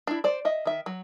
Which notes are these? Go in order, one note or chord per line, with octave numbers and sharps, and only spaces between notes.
D4 E4
C5 D5
D#5 E5
D#3 E5
F#3